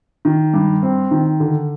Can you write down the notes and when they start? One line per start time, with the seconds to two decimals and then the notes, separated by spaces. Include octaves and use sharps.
0.25 D#3
0.54 G2
0.83 C4
1.11 D#3
1.40 D3